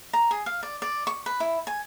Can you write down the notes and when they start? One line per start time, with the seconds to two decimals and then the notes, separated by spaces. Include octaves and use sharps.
0.13 A#5
0.31 G#4
0.46 F5
0.63 D5
0.82 D5
1.07 C#6
1.26 B4
1.40 E4
1.67 G#5